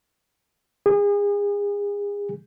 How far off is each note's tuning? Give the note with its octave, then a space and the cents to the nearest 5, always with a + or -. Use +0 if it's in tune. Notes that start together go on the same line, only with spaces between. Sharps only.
G#4 -35